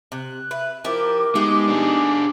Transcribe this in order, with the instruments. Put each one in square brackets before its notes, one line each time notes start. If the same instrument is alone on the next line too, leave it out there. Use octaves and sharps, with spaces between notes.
[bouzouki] C3 [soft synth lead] F#6
[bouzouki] B4 [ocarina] E5
[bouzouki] F3 E4 G4 [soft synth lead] A#4 [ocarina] D6
[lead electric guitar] G#3 [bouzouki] A3 B3 G4 [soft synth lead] D#4
[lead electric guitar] D4 G#4